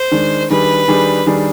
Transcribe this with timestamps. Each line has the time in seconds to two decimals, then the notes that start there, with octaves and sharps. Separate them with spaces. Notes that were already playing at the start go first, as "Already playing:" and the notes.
Already playing: C5
0.12 D#3 G#3 D4
0.50 D#3 G3 D4 G#4 B4
0.88 D#3 G3 D4 G#4
1.26 D#3 G3 D4 G#4